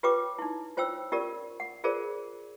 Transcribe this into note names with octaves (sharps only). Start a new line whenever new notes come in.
F4 G4 B4 C#5 G5 D6
D#4 E4
F4 C5 C#5 G5 E6
C#4 F4 G4 A#4 D5
F#5
F4 G#4 A#4 C5 D5